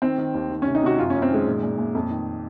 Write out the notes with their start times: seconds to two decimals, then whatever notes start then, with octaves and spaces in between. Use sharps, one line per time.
0.02 D#3 C4
0.18 D#3
0.34 D#2
0.50 D#3
0.62 C3 C#4
0.75 D#4
0.82 C3 F#4
0.98 F#2 F4
1.10 F#2 C#4
1.22 C4
1.30 D#3 G#3
1.46 A#2
1.63 A#2
1.78 A#2
1.95 F2
2.11 D#3